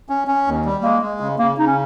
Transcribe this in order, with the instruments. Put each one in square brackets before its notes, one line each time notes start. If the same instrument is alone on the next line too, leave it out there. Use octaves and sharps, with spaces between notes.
[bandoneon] C#4
C#4
D#2
G3
[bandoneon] G#3 [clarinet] A#3
[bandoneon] G#3
C#3
[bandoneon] C#3 [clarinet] A#3
[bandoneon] C#3 [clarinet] D#4
[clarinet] C#4